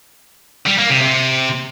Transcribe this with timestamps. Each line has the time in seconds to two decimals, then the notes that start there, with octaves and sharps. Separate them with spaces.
0.67 G3
0.79 A#3
0.90 C3
1.02 C3